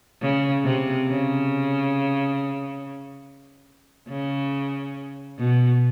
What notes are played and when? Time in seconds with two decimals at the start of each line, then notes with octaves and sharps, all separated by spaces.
0.22 C#3
0.64 C3
1.08 C#3
4.09 C#3
5.39 B2